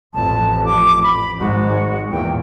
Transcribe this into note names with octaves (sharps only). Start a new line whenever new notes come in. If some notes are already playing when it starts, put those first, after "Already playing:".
A1 F2 A5
D6
B5
G#1 G#2 G#3 F#4
E2 A#2 G5